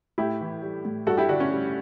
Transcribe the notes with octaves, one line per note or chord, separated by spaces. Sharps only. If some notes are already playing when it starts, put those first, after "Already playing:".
A2 E4 G4
E3
G3
A2
G2 F#4 A4
E4 G4
D3 D4 F#4
C#4
G3